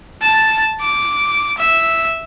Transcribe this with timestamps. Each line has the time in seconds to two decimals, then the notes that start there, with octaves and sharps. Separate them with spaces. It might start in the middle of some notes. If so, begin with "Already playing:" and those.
0.22 A5
0.81 D6
1.58 E5